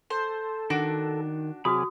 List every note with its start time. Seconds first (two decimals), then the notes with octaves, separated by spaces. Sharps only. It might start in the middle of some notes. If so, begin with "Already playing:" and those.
0.10 A4 C5
0.70 D#3 D4 F#4 D6
1.65 C3 F#3 F#4 G#4 B5 D6 D#6 F6